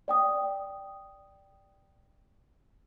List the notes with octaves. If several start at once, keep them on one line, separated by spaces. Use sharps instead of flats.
D5 G5 D#6